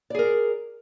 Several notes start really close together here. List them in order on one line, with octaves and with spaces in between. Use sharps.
D5 G#4 A#4